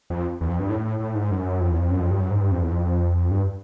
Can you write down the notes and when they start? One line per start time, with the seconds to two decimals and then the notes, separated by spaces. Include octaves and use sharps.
0.10 F2
0.41 E2
0.50 F2
0.60 G2
0.70 A2
1.00 A2
1.15 G#2
1.31 F#2
1.61 F2
1.71 E2
1.80 F2
1.91 F#2
2.00 F2
2.10 G2
2.21 F#2
2.31 G#2
2.40 G2
2.52 F2
2.61 E2
2.71 F2
3.31 G2